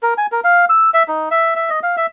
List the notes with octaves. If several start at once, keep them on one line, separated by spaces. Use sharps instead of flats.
A#4
G#5
A#4
F5
E6
E5
D#4
E5
E5
D#5
F5
E5